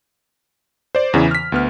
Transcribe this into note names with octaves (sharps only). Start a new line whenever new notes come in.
C5 D5
E2 C#3 E3
F6 B6
D2 B3 F6